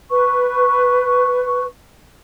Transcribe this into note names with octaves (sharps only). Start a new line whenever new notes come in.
B4 C#6